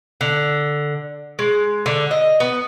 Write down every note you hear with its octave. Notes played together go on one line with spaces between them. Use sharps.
D3
G#3
D3
D#5
B3